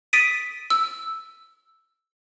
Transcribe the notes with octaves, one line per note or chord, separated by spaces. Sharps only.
D#6 A6 B6 D7 D#7
E6